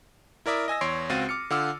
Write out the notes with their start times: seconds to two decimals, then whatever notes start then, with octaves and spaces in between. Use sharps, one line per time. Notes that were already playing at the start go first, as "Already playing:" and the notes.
0.46 E4 A#4 D5 E5 D#6
0.68 D#5 G#5 E6 A#6
0.81 E2 C#5 C6 C7 D7
1.09 C#2 C4 F#4 F5 A6 D#7
1.29 D6 F6 C#7
1.50 D3 F4 F#5 D6 E6 F6